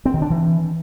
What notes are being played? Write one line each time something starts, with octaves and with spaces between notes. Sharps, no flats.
C4
D#3
D4
E3